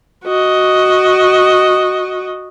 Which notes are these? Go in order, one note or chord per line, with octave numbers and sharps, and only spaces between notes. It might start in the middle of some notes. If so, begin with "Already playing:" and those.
F#4 D#5